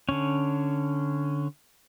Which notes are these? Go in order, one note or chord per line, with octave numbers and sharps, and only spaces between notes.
D3 C#4